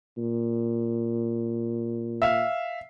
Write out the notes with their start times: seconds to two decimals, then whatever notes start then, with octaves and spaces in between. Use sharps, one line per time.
0.18 A#2
2.22 E5 F5